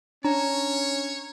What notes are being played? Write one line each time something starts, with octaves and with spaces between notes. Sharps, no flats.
C#4 D4 C#5 A#5